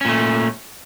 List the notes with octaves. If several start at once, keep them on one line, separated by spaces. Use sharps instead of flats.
A#2 A3 C#4